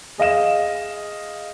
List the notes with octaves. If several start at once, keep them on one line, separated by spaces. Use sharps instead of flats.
G#4 D#5 F5 E7